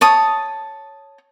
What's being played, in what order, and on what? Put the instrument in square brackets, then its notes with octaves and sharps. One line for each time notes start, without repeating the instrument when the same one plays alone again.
[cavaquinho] C#5 A5 D#6